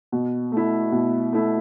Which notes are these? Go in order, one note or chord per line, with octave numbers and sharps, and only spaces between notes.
B2
A3 E4
B2
A3 E4